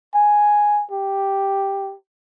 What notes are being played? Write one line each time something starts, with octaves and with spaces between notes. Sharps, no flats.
G#5
G4